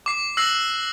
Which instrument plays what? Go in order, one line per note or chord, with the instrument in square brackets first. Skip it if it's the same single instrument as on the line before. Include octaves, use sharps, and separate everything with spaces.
[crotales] D6 C7
D6 E6 F#6 A#6 C7 F#7